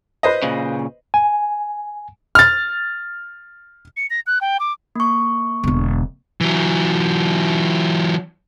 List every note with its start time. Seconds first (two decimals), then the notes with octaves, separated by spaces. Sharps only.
0.23 B4 C5 D#5
0.43 A#2 C#3
1.14 G#5
2.35 F6 A6
3.97 C#7
4.10 A#6
4.27 F#6
4.41 G5
4.60 D6
4.95 A#3 C#6
5.64 E1 D3
6.41 E3 F#3